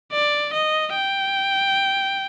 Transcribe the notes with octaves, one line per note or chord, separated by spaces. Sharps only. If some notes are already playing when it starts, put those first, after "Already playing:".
D5
D#5
G5